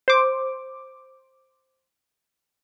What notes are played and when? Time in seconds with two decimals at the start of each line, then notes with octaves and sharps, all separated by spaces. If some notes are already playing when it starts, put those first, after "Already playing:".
0.08 C5 D6